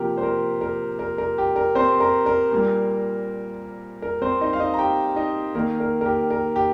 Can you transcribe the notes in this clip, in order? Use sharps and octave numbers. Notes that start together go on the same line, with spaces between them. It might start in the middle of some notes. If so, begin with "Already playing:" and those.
Already playing: C3 F3 A#3 G4 A#4
C5
A#4
A#4
A#4
A#4
G4
A#4
C4 C5
A#4 A#5
A#4
A#2 G3 A#3
A#4
C4 C5
D#4 D#5
F5
D#4 D#5
A#5
G4 G5
D#4 D#5
D#3 A#3 A#4
A#4
A#4
G4
A#4
G4